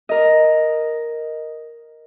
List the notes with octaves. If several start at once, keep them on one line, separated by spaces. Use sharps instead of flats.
A#4 D#5